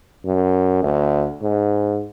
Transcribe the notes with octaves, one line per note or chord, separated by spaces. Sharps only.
F#2
D2
G#2